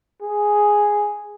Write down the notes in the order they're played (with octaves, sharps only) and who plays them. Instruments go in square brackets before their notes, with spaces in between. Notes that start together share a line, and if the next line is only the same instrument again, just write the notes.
[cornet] G#4